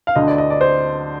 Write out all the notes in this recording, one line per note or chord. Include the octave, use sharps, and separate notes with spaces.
F5
D2 D3 D#5
D5
D#5
D5
C5